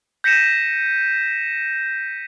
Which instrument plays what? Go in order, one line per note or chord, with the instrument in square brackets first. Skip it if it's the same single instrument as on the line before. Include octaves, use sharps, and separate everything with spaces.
[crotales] G6 A#6 B6 C#7 D#7 E7